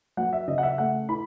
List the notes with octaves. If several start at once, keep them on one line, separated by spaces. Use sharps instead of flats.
F#3 F#5
E5
C#3 D#5
F#5
E5
A3 F#5
E4 B5